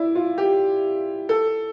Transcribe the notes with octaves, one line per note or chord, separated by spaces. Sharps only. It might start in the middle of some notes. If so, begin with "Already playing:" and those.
Already playing: E4 D5
F4
G4
A4